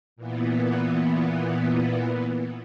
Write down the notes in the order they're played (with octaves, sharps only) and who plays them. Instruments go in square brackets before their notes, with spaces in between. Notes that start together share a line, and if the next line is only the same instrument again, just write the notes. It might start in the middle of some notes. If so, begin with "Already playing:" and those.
[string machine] A#2 E3 B3